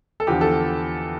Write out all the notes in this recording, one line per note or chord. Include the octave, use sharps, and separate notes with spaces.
A4
E2 D3 F3 G4
A4